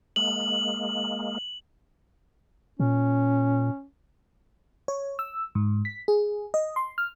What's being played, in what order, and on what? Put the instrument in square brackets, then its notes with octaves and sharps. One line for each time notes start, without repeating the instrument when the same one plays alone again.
[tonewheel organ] G#3 A#3 [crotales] F#7
[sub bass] A#2 [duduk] C#4
[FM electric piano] C#5
E6
G#2
B6
G#4
D#5
C6
F6